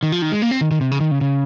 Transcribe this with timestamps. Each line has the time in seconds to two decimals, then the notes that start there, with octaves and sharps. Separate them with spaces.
0.03 D#3
0.12 F3
0.22 D#3
0.32 G#3
0.42 A#3
0.51 C4
0.61 D#3
0.71 D#3
0.81 C3
0.92 C#3
1.00 D#3
1.11 C#3
1.21 C#3